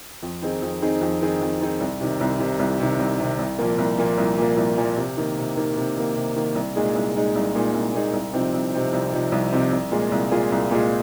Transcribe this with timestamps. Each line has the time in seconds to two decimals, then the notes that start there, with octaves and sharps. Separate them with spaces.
0.22 F2
0.42 D#3 C4 D#4 G#4
0.62 F2
0.82 D#3 C4 D#4 G#4
1.01 F2
1.22 D#3 C4 D#4 G#4
1.41 F2
1.61 D#3 C4 D#4 G#4
1.80 C2
2.01 C3 D#3
2.21 C2
2.40 C3 D#3
2.59 C2
2.80 C3 D#3
2.99 C2
3.20 C3 D#3
3.39 C2
3.59 A#2 F3 A#3
3.78 C2
3.98 A#2 F3 A#3
4.18 C2
4.38 A#2 F3 A#3
4.57 C2
4.77 A#2 F3 A#3
4.97 C3
5.17 D#3 A#3
5.38 C3
5.57 D#3 A#3
5.76 C3
5.97 D#3 A#3
6.15 C3
6.36 D#3 A#3
6.55 C2
6.76 A#2 G#3 D#4 G#4
6.96 C2
7.16 A#2 G#3 D#4 G#4
7.35 C2
7.55 A#2 G#3 D#4 G#4
7.75 C2
7.94 A#2 G#3 D#4 G#4
8.13 C2
8.33 C3 F3 C4 D#4
8.54 C2
8.74 C3 F3 C4 D#4
8.93 C2
9.13 C3 F3 C4 D#4
9.32 C2
9.53 C3 F3 C4 D#4
9.72 C2
9.91 A#2 G#3 F4 G#4
10.12 C2
10.31 A#2 G#3 F4 G#4
10.52 C2
10.71 A#2 G#3 F4 G#4